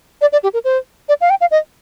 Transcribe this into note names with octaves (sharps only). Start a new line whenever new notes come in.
D5
D5
G4
A#4
C5
D5
F5
G5
F5
D#5